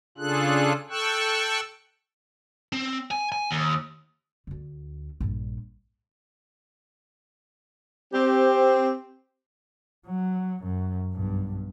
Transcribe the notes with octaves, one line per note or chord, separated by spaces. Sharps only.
C#3 D4 F4 G#4 A4 F#6
A4 G5 C#6 E6 F#6
C4
G#5
G#5
D#2
D2 D3
A#1 G2
C4 G4
F#3
F#2
B1 G2